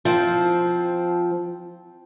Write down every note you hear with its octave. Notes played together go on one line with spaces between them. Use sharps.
F3 C4